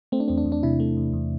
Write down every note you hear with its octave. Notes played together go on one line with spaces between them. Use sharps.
A3 C4
D4
E2 C4
D4
E2
D4
C3 E4
A3
E2
E2